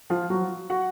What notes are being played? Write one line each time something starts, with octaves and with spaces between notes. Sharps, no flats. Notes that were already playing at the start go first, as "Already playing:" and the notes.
F3 F4
F#3 F#4
F3
F#4 F#5